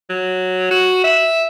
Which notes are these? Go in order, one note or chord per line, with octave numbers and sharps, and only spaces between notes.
F#3
F#4
E5